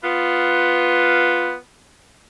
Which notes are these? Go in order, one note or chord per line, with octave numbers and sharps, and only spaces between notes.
B3 F4